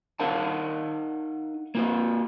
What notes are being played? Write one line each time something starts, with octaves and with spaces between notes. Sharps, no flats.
D#4 A#4 F5 F#5 A5
A#3 F4 B4